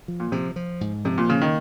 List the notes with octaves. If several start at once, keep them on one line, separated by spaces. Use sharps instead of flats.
F3
A#2
C3 F3
F3
G#2
C3 F3
A#2
C#3 A#3
D#3